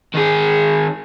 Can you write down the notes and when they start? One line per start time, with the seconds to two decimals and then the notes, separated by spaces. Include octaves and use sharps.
0.14 D#3 G#4